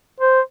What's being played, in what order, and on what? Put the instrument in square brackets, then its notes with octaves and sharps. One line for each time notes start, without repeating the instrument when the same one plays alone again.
[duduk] C5